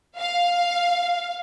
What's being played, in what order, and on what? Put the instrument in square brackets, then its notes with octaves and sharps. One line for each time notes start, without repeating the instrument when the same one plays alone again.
[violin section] F5